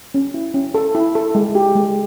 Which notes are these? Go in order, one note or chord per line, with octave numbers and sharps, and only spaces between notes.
C#4
E4
C#4
A4
E4
A4
G#3
G4
G#3